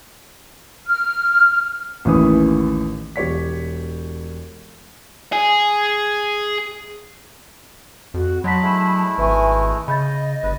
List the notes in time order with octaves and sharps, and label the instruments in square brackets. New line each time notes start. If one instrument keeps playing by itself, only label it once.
[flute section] F6
[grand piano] A1 D#2 C#4 E4 B4 D#6
E1 G4 C#5 B6
[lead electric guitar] G#4 G#5
[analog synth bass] F2 [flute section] F#4
[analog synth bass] F#3 [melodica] D#4 F#4 C#5 [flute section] A5 B5 [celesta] C6 B6
[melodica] G#3 A3 E4
[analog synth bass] G#1 [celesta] B4 E5 C#6 [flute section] G#5
[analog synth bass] C#3 [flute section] D#5 [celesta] B5 G6 A6
[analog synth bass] G1 [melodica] B4